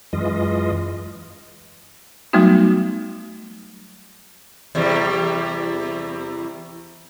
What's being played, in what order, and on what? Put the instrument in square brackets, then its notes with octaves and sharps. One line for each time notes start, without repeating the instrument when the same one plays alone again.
[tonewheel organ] F#2 E3 G#3 F4 D#5
[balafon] F#3 G3 A3 B3 D#4 F#4
[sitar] E2 C3 G3